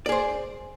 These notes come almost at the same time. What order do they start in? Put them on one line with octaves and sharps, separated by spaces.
D5 G#4 C5